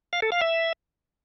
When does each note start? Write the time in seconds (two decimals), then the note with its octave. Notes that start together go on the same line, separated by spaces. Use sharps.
0.13 F5
0.22 A4
0.32 F5
0.41 E5